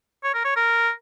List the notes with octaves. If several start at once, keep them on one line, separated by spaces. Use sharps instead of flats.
C#5
A#4
C#5
A#4